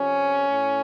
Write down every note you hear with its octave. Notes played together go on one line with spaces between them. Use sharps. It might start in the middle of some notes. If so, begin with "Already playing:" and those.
Already playing: F2 C3 F3 C#4
A2